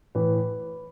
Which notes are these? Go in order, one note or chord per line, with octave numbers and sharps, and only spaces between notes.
A2 E3 B4